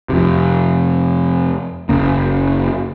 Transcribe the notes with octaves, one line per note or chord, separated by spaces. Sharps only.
F2 C3
F#1 D#2 C#3 A#3